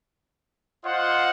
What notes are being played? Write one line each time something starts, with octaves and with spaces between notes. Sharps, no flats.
F4 C5 D#5 F#5